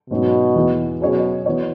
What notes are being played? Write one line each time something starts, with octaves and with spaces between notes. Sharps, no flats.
G#2 B2 F#3 C#4
E2 E3 B3
B2 F#3 C#4 G#4 C#5
E3 B3 F#4 C#5